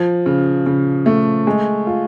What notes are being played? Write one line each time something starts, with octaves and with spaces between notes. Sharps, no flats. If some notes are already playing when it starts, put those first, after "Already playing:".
Already playing: F3
C#3
C#3
A3
G#3
F4